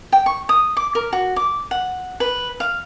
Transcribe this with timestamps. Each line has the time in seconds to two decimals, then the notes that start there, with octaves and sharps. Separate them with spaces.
0.12 G5
0.26 C#6
0.49 D#6
0.77 D6
0.95 A#4
1.13 F#4
1.36 D6
1.71 F#5
2.20 B4
2.60 F5